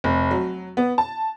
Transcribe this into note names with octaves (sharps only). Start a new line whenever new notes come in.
F1
F#3
B3
A5